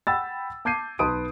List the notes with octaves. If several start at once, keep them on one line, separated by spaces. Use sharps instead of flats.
F#5 G5 B5 E6 A6
A5 D6 G6 G#6 C7 D#7
B1 B4 A5 C6 D#6 D7